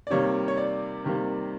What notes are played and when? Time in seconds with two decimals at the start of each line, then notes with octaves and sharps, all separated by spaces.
0.07 D5
0.10 C3 D#3 G3 A#3 C#5
0.48 C#5
0.57 D5
1.04 C3 D#3 G3 A#3